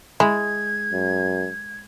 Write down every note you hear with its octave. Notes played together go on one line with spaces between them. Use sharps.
G#3 E4 G#6
F#2